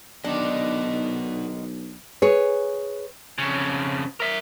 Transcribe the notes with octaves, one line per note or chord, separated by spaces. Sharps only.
B1 D3 D#3 B3 D4 D#4 D#5
G#4 B4 C#5
F2 C#3
A#4 E5